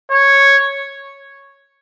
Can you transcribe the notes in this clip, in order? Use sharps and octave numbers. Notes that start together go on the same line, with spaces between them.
C#5